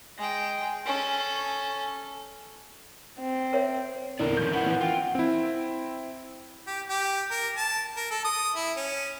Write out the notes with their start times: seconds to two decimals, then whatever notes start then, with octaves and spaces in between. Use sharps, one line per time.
0.18 G#3 G5
0.86 C#4 A4
3.20 C4
3.53 A#4 C#5 E5
4.19 E2 A#2 D3 C4 E4 A#4 D5
4.37 D#3 F3 C#4 G6
4.53 C#4 E4 B4 F#5 F#7
4.66 E3
4.80 F4 G5
5.15 C4 E4
6.67 G4
6.89 G4
7.31 A#4
7.56 A5
7.96 A#4
8.11 A4
8.25 D#6
8.55 E4
8.77 C#4